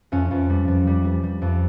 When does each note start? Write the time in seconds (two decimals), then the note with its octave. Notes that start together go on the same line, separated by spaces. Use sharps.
0.12 F2 C#4
0.31 F2
0.49 G3
0.68 F2
0.87 G3
1.05 G3
1.23 G3
1.42 F2